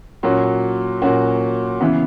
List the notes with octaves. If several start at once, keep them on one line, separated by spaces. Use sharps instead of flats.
A#2 F#3 C#4 F#4
A#2 F#3 C#4 F#4
C#3 E3 B3